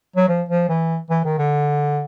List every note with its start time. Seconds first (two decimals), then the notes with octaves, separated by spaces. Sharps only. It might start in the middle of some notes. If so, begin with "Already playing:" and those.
0.16 F#3
0.28 F3
0.49 F3
0.69 E3
1.10 E3
1.25 D#3
1.38 D3